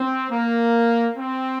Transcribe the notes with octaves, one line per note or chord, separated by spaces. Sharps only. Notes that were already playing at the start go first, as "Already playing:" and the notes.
Already playing: C4
A#3
C4